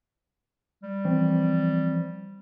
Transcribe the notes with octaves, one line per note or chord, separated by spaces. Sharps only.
G3
E3 F3 C4